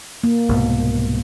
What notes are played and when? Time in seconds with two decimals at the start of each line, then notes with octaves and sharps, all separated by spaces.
0.24 A#3
0.49 C2 G#2 B2